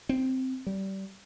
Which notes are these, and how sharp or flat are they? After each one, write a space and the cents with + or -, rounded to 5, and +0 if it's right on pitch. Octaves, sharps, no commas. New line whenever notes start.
C4 -5
G3 -25